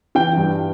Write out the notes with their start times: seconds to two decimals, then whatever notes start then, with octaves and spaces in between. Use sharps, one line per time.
0.15 E3 G5
0.37 G2